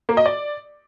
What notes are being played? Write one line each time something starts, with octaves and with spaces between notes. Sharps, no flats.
A#3
D#5
D5